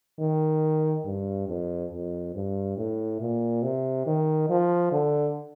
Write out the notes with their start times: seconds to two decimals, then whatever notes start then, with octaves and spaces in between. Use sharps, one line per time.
0.19 D#3
1.05 G2
1.48 F2
1.92 F2
2.35 G2
2.78 A2
3.21 A#2
3.63 C3
4.06 D#3
4.49 F3
4.92 D3